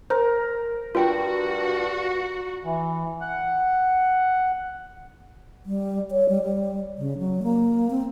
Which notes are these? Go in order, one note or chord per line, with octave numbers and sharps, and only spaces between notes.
A#4 C5
G2 F4 F#4 G5
E3
F#5
G3
C#5
G3
G3
C#3
F#3
A#3
C4